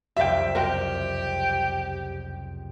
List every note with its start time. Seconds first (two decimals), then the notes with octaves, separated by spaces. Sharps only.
0.17 F#1 C2 F2 G4 E5 F5 G5
0.55 C4 F#4 G4 A#4